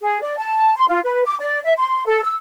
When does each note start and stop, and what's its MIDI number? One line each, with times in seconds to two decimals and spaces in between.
0.01 0.18 68
0.21 0.35 74
0.38 0.74 81
0.76 0.85 84
0.88 0.99 65
1.04 1.23 71
1.25 1.36 86
1.40 1.60 74
1.65 1.73 76
1.78 2.04 84
2.06 2.20 69
2.23 2.34 88